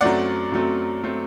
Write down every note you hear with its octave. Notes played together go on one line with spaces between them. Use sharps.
F#2 F#3 A3 C4 D5 F#5
F#2 F#3 A3 C4
F#3 A3 C4